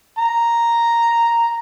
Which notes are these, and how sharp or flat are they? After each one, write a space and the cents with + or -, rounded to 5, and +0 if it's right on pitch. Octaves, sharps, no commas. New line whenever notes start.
A#5 +0